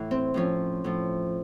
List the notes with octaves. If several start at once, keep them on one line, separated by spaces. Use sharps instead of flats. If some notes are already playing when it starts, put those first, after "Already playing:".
Already playing: A2 E3 E4
C4
A2 F3 C#4
A2 F3